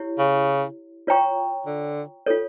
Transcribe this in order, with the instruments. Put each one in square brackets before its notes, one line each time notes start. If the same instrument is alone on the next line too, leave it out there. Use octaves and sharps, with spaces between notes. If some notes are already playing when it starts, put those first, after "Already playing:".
Already playing: [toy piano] E4 G4 C#5
[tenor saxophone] C#3
[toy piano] F4 C#5 G5 A#5 C#6
[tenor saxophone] D3
[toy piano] F4 A4 C#5